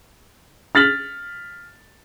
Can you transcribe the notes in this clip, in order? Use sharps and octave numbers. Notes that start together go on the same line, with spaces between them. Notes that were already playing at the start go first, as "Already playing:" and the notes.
F6 A6 B6 F#7